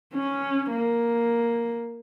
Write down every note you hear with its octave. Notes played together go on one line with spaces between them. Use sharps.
C#4
A#3